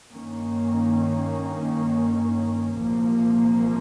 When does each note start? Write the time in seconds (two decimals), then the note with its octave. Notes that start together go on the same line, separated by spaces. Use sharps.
0.12 G2 D#3 A#3 C#4
2.74 C2 A#2 F3 A#3